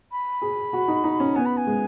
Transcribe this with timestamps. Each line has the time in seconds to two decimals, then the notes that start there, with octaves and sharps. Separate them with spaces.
0.12 B5
0.42 G#4
0.73 F#4
0.88 D#4
1.04 D#4
1.20 C#4
1.35 B3 G#5
1.45 B5
1.57 G#5
1.67 G#3